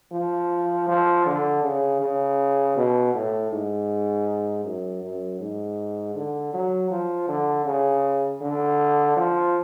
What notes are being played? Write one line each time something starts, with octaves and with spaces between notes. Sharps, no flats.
F3
F3
D3
C#3
C#3
B2
A2
G#2
F#2
F#2
G#2
D3
F#3
F3
D3
C#3
D3
F3